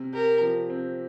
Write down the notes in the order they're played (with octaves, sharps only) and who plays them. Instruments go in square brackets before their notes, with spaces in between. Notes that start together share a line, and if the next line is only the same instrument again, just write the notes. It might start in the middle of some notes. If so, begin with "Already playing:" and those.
Already playing: [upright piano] C3
[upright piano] G4 [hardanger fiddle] A#4
[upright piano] F3
C4